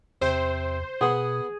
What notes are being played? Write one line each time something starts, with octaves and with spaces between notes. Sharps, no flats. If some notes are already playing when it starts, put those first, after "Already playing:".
E2 C3 C5
B2 B3 G#4 F#5